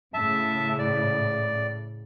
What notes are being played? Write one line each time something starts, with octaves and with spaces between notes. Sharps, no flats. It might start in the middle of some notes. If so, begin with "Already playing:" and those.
A2 C#3 E5 A5
D5